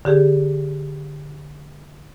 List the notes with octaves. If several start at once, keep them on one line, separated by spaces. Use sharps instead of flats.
D3 G4 G#4